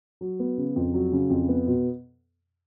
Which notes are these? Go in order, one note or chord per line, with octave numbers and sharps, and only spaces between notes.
F#3
B3
C#3
F2
F#3
C#3
F2
B3
B2